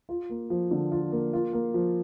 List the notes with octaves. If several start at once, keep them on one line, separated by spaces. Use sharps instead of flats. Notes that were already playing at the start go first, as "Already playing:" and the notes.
F4
A#3
F3
D3
F4
A#3
F4
A#3
F3